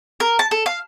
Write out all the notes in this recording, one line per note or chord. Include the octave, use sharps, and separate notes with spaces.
A#4
A5
A4
F5